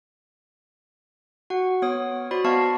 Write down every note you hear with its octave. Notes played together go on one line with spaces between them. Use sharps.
F#4 F#5
B3 C#5 D#6
F#4 C5 D5 B5
B3 D#5 F5 A5 C#6 C7